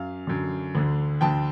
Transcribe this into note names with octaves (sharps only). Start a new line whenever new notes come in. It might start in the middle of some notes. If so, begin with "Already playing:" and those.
Already playing: F#2 F5
F#2 D3
D2 D3
D2 D3 G5 A5